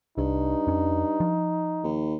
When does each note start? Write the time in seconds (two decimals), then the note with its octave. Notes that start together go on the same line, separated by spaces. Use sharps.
0.18 C2 G2 D#4
0.67 F2 C#4
1.20 F3
1.83 D#2